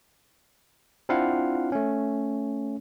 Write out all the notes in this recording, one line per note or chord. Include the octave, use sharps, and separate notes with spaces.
C4 D4 E4 F4 F5 F#5
A3 C#4